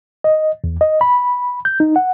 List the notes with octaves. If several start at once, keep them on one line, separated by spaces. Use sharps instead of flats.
D#5
E2
D#5
B5
G6
D#4
F#5